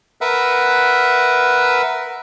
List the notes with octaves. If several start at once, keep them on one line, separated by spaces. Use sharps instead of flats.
A#4 B4 E5 F#5